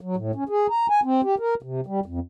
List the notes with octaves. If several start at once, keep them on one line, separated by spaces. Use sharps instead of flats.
F#3
A2
C#4
G#4
A#5
G#5
C4
G4
A#4
C3
G3
F2